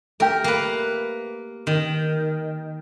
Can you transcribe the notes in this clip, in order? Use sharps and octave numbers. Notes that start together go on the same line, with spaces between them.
A3 G4 A#4
A#3 B4
D#3